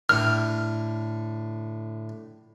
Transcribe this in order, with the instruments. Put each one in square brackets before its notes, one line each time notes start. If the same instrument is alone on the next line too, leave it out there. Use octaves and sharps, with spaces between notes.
[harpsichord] A2 D3 [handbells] F6